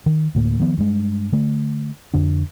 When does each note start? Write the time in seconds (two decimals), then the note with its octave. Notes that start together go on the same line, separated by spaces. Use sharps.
0.06 D#3
0.35 D2 A2 A#3
0.60 D#3 F3 B3
0.78 G2 G#3
1.32 D3 A3
2.14 F2 D3 D4